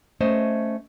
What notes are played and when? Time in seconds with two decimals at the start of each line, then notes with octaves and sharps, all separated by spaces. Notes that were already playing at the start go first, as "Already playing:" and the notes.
0.20 A3 C#4 C5 D#5